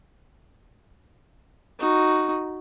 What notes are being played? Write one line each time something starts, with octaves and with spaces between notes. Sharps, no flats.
D#4 F#4